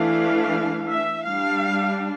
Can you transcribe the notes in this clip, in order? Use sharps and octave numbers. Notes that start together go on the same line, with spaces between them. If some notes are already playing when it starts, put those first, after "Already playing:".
Already playing: E3 A3 D4 F5
E5
G3 D4 F5